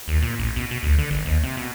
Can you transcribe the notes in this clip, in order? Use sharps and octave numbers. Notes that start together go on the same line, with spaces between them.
D#2
A#2
A1
B2
B2
D2
D3
G#1
D#2
C3
B2